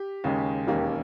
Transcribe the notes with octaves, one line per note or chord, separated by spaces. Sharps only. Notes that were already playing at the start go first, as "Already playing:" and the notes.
Already playing: G4
D#2 C#3 G#3 C#4
E1 D#2 D#3 A#3 C#4 G4